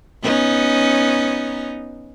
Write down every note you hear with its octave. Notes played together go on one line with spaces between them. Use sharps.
B3 C#4 D#4